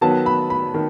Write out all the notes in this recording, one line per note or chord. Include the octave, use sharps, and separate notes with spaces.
D#3 F#3 B3 A5
B5
B5
D#3